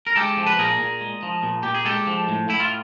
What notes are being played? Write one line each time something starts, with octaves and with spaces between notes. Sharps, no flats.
A#4
G#3 G4 A4
F3
B4
A#2 G#4 A#4
A#2
G#3
F3
A#2
A#2 G4
G#4
G#3 G4 A4
F3
A2
A2 E4
F4